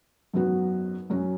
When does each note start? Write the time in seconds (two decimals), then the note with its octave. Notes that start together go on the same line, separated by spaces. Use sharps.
0.33 G#1 F#2 F#3 B3 F#4
1.10 F#2 F#3 C#4 F#4